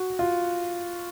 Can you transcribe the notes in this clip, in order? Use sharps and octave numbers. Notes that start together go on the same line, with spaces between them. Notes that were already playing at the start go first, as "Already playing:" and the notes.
Already playing: F#4
F4